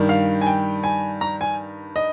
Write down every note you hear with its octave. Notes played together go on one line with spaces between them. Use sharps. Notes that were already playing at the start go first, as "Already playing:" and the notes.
Already playing: G2 D#3 G3
F5
G#5
G5
G#5
A#5
G#5
D#5